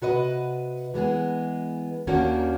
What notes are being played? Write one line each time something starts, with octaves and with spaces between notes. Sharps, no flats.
C3 F#4 B4 D#5
E3 G#3 B3 G#4
D#2 D#3 A#3 C#4 D4 F#4